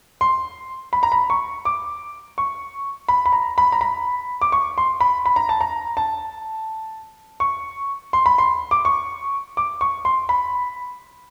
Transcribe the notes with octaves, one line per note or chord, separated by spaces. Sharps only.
C6
B5
A#5
B5
C#6
D6
C#6
B5
B5
A#5
B5
A#5
B5
D6
C#6
C6
B5
B5
A#5
A5
A#5
A5
C#6
C6
B5
C6
D6
C#6
D6
C#6
C6
B5